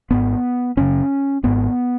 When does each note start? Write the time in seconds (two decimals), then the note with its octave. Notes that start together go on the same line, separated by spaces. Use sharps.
0.10 G#1 G#2 B3
0.77 F#1 F#2 C#3 C#4
1.43 G#1 G#2 B3